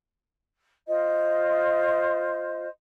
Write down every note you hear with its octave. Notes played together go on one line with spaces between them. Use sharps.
F4 C5 D#5